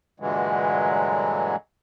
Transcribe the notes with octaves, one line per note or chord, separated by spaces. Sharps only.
G2 A#2 D3 E3 F#3 G#3